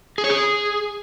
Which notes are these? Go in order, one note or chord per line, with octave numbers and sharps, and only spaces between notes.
G#4
C#5
G#4